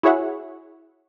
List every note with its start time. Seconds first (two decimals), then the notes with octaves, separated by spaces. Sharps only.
0.03 E4 F#4 G#4 C#5 E5 F#5